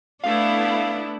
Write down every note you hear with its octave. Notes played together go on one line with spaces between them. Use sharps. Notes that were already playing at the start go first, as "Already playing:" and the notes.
A3 B3 D4 E4 F5